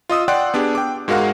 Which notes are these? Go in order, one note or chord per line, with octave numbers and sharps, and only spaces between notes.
F4 D#5 D#6 E6
D5 F#5 G5 C6 F#6
B3 D4 G4 G#4
G5 D6
G#2 G#3 F#4 A#4 F5 F#5